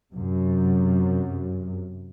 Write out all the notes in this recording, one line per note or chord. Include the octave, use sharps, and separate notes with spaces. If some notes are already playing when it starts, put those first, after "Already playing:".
F#2 C3